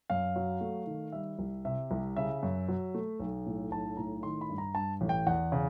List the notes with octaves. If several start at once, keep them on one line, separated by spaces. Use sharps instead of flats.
F#2 F5
F#3
A3
D#3
G3 E5
C2
C3 E5
C2
C#3 E5
F#2
F#3
A3
B1
A2
B1 A5
A2 A#5
D#3 C6
B5
G2
A#5
G2 A5
A1
G5
E2 F#5
C#3